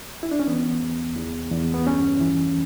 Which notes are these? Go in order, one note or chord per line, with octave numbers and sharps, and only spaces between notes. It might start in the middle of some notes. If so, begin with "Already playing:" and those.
E4
D4
C#4
E3 B3
E2
E2
E2
B3
G2 C#4
E3